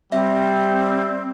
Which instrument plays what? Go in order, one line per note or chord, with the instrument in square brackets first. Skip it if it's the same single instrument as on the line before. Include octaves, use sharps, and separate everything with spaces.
[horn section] G3 [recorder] C4 [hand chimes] E5